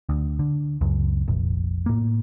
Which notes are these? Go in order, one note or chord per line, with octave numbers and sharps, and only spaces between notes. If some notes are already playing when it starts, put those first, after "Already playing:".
D2
D3
C#2 F#2
F1 A#1
A2 A#3